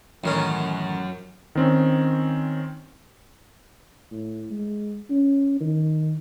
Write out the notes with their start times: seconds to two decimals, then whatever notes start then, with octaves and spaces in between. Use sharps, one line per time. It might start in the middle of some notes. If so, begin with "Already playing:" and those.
0.24 A1 F#2 D#3 C#4
1.55 D#3 C4 C#4
4.11 A2
4.51 G#3
5.10 C#4
5.60 D#3